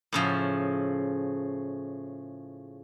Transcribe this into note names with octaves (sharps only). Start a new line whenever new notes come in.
A2 C#3 F3